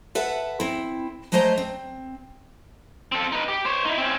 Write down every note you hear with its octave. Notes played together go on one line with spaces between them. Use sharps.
A4 B4 E5 F#5
C4 E4
F#3 G#3 A3 C5 D#5 A#5
C4
C4 A4
D#4 B4
G4
C5 C#5
D#4 E4
C4 C#4